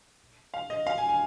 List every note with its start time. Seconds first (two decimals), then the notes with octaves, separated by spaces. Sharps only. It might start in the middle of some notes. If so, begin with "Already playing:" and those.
0.54 F5
0.70 D#5
0.87 F5
0.98 G#5
1.09 G#5